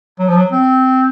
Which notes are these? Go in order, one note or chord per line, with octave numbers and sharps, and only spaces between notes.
F#3
F3
F#3
C4